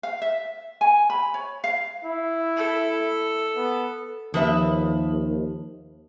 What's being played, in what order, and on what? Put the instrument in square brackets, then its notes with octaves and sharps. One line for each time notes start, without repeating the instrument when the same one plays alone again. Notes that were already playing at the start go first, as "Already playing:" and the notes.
[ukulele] F5
E5
G#5
B5
C#5
F5
[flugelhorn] E4
[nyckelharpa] A4
[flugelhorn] B3
[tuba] D#2 [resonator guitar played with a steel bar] F3 B4 E5